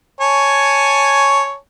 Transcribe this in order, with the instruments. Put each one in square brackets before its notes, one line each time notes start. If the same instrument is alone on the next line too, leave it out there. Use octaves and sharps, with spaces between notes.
[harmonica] C#5 G#5 A5